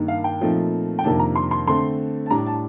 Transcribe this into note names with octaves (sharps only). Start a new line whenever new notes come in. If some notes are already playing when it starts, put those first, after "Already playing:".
Already playing: G2 D#3 A#3 D#4
F5
G5
A#2 F3 A3 C4 D#4
G5
F2 C3 D#3 A#3 D4 A5
A#5
C6
C6
D3 A3 C4 C6
A5
A2 G3 D4 A#5
A5